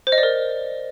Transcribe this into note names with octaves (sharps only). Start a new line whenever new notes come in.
C5
D#5
D5
A#4